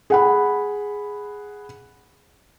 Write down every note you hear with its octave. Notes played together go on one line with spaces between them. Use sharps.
G#4 F#5 B5